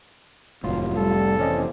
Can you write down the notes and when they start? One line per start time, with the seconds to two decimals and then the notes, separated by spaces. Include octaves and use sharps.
0.64 F1 D#2 A2 F#3 F4
0.96 G3 A4
1.39 A1 C4 C#4 D5 D#5